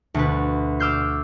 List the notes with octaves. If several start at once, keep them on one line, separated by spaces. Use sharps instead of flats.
D2 B2 B4
D6 E6 F6 G6 C7